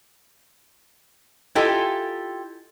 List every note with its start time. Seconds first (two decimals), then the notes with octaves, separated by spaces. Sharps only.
1.55 E4 F4 G4 A4 D#5 G#5